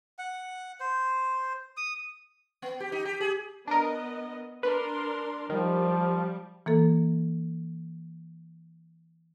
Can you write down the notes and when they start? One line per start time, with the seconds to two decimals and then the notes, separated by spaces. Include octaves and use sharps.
0.19 F#5
0.80 C5
1.77 D#6
2.62 B3
2.80 G4
2.92 D#4
3.05 G4
3.21 G#4
3.68 B3 D4 A#4 D#5
4.63 D4 A#4 B4 C6
5.49 D#3 F3 G3
6.66 E3 A#3 A4